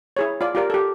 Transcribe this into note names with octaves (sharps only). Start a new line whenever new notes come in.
E4 G#4 C#5
F4 D5
F4 G4 A#4 D5
G4 A4